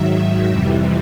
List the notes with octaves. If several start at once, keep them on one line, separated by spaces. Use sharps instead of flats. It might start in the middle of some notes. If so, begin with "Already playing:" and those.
Already playing: G#2 D#3 F#3 E5
F2 C3 E3 G3 E5